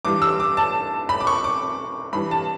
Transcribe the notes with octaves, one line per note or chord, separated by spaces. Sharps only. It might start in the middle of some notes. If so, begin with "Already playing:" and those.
G2 E3 G3 D6
E6
D6
A5
B5
D6
C#6
D6
G2 E3 G3 B5
A5